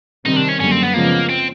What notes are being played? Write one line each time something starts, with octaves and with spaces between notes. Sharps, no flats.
C3 D#3 G3 C4 D#4
D4
C#4
F#2 D3 G3 A#3 C#4
C4
B3
C#3 F3 G#3 A#3 B3
C4